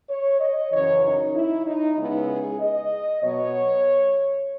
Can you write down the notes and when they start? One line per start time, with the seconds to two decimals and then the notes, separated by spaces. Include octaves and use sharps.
0.09 C#5
0.40 D#5
0.71 F#2 C#3 E3 C#5
1.03 D#4
1.35 E4
1.66 D#4
1.97 C#3 G#3 B3 E4
2.28 G#4
2.60 D#5
3.22 B2 F#3 B3 C#5